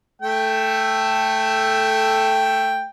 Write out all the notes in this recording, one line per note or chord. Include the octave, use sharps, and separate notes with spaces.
A3 A4 G5